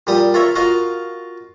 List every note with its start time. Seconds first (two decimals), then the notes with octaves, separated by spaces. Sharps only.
0.07 A#2 G3 G4 D#6
0.34 F4 A4 A#4 C#5 E5
0.56 F4 F#4 A#4 D#5 F5